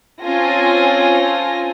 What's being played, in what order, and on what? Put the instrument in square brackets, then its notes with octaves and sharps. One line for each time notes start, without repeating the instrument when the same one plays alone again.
[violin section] C4 C#4 F4 A4 G#5 A#6